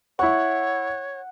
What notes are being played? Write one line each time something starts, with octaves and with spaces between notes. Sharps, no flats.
E4 C#5 F#5 C#6